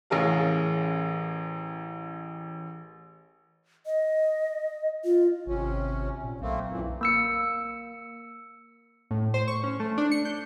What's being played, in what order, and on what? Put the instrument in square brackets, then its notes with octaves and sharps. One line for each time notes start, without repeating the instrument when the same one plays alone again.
[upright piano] A1 C#4 G#4 A#4 F5
[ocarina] D#5
F4
[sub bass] G#1 [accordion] C3 C#4
[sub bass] A#2
[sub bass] B1 [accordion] A3 A#3 C4
[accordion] F#2 A#2 E3
[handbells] A#3 E6 C#7
[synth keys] A2
C5
C#6
C#4
A3
D4
C#7
G6